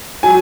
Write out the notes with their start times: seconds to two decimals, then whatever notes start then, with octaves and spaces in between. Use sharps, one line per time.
0.23 F#3 G#5